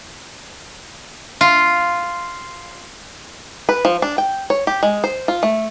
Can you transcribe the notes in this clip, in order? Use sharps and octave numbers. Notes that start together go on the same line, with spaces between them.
F4
B4
F3
D4
G5
C#5
G4
G#3
C5
F4
A3